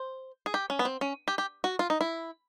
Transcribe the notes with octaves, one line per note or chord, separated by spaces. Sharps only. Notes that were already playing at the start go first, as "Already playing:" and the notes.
Already playing: C5
G#4
G4
C#4
B3
C4
C#4
G4
G4
F#4
F4
D#4
E4